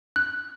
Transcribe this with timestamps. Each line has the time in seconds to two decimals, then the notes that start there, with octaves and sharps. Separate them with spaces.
0.16 F#6